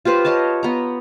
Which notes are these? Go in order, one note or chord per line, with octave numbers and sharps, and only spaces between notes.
F4 G4 B4 C5
C#5 D#5 F5 A5
B3 A#5